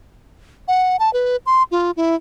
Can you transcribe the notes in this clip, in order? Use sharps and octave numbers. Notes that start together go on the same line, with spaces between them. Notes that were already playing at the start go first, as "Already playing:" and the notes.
F#5
A5
B4
C6
F4
E4